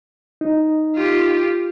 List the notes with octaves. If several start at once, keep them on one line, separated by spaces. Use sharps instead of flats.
D#4
F4 G4